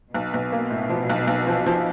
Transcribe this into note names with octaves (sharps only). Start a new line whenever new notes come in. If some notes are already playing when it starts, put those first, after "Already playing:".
B1 B2
B1
A#3
A2
F3
B1
B1
F3
F3